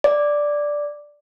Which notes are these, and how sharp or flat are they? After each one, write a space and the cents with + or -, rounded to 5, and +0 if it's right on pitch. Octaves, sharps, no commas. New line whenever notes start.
D5 +0